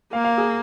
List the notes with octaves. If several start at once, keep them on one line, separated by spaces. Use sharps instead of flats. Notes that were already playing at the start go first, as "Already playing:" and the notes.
A#3 F5
F5
G#4